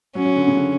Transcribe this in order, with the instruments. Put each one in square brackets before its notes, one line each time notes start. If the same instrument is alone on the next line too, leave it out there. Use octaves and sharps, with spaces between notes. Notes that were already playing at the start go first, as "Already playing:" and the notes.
[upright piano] F#3 [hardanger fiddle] C#4
[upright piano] F#3
D3
C#3
D3